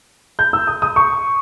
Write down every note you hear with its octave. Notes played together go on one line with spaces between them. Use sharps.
G6
E6
D#6
D#6
C#6